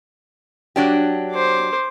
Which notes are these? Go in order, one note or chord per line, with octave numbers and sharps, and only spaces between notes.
F#3 D4 G4
C5 D6